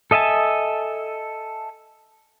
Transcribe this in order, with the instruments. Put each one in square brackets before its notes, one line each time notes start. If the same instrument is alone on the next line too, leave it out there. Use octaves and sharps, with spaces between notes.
[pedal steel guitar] A4 D#5 E5 G#5 A5